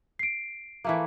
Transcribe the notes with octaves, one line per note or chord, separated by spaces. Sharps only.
C7 D7
E3 A3 A#3